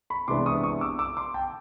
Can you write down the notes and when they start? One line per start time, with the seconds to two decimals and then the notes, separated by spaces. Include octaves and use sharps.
0.10 B5 C#6
0.28 C3 E3 G#3 B3 D4 C6 D6
0.46 C#6 D#6
0.63 C#6 D#6
0.81 D6 E6
0.99 D6 E6
1.17 C6 D6
1.34 G5 A5